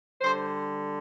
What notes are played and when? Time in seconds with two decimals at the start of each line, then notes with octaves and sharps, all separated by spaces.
0.21 D3 G3 C5